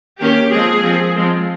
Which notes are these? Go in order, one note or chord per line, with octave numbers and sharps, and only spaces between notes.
D#3 A#3 C#4 G4
F3 G#3 C4 G#4
F3 C4
F3 G#3 C4